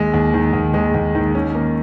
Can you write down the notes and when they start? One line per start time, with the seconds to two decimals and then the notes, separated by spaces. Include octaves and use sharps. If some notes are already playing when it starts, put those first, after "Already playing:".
Already playing: D#2 G#3
0.14 D#2
0.34 D#3
0.53 D#2
0.74 G#3
0.94 D#2
1.15 D#3
1.35 C#4
1.55 A#3